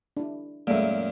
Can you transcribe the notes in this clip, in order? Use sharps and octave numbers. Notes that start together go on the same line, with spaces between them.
D4 E4
F#2 A#2 G#3 A3 E5